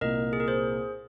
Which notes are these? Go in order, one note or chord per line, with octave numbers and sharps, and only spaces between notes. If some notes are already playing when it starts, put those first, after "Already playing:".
C2 A#2 A#3 A#4 D#5
G#4
A#4
G#4 C5